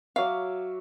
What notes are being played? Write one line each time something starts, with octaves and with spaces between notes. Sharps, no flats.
F#3 E5 F5 D6